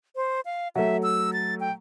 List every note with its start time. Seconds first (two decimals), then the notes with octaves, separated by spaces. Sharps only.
0.16 C5
0.45 F5
0.76 F#3 A3 E5
1.03 E6
1.33 A6
1.60 G5